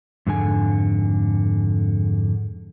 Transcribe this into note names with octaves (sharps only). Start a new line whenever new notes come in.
F2 G#2 D3 G#5